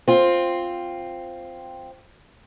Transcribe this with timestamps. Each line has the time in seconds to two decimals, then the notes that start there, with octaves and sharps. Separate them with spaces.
0.08 C4 F4